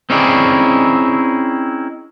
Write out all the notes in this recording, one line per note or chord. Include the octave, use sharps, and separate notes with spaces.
C4 C#4 D#4 E4 G#4 D5